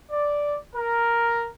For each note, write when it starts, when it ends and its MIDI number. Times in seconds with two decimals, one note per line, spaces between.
0.11 0.56 74
0.74 1.49 70